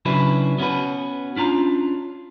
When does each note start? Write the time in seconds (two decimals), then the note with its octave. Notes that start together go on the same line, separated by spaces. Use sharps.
0.05 C#3 F#3 D4 E4 B4
0.58 B3 C#4 F4 F#4 B4
1.36 C#4 D4 F4 A#5